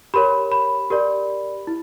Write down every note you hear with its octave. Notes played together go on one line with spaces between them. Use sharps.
G4 A#4 C#5 B5
B5
G4 A#4 D5
E4